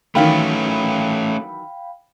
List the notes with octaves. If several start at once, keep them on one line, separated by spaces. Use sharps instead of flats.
D#3 E3 F#3 A3 C#4 F5 G5 B5